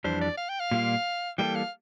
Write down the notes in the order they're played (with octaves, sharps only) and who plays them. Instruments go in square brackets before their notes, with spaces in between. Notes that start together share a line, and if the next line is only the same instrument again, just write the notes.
[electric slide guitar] F2 E3 G3 D4 [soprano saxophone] C5
[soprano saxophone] D5
F5
G5
F5
[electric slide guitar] A#2 G3 A#3 F4
[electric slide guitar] E3 G3 A#3 D4 A4 [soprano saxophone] G5
[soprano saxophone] F5